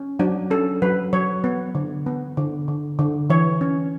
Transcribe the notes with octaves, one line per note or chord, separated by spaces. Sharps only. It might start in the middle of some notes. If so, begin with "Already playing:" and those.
Already playing: C#4
F#3 D4
C#4 A4
F#3 B4
F#3 C#5
B3
D3
B3
D3
D3
D3
E3 C#5
C#4